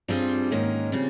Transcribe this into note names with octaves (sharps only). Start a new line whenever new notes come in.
G2 G3 C4 F4 G#4
G#2 D#3 A#3 C#4
C#3 G3 C4 F4